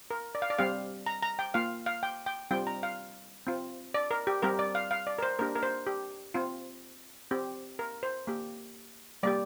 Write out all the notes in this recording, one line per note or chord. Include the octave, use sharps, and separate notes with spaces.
A#4
D5
F5
D5
G3 C4 G4 F5
A#5
A#5
G5
A#3 F4 F5
F5
G5
G5
G3 C4 F4 G5
A#5
F5
C4 F4
D5
A#4
G4
G3 C4 G4 A#4
D5
F5
F5
D5
A#4
C5
A#3 D4 G4 A#4
A#4
C5
G4
C4 F4
C4 G4
A#4
C5
A#3 G4
G3 A#3 G4 D5